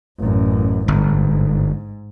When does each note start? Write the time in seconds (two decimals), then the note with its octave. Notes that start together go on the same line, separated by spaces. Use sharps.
0.19 A1 F#2
0.88 G1 G#2